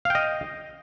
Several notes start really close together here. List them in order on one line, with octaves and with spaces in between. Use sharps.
F5 G5 D#5